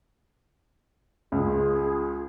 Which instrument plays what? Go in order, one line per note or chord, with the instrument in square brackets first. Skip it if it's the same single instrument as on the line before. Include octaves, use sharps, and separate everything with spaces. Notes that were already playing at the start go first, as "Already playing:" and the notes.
[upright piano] C#2 [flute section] F4 G#4